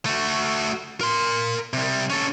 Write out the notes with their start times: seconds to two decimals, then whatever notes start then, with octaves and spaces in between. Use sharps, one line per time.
0.05 A3 F#4
1.01 A#4 C6
1.73 C3 G3
2.10 C#4 A4